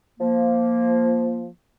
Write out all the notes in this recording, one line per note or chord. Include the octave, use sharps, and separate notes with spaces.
F3 A#3